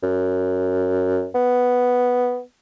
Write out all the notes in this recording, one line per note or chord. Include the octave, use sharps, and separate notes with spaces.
F#2
B3